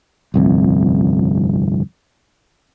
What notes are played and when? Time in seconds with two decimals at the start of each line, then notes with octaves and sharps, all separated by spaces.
0.34 G1 C2 F2